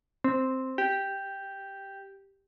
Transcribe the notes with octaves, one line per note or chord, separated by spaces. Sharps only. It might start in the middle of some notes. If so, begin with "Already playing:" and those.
C4
G4